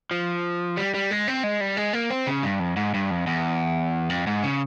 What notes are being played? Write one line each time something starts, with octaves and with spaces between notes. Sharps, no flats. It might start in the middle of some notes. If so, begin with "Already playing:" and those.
F3
G3
G3
G#3
C4
G#3
G3
G#3
A#3
C4
C#3
G2
F2
G#2
G2
F2
E2
F2
G#2
C#3